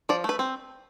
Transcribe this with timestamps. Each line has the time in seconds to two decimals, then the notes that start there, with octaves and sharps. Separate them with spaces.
0.09 F3 D5
0.24 A3 B4
0.39 C4